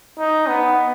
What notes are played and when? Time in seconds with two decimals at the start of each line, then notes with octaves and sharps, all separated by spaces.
0.18 D#4
0.47 B3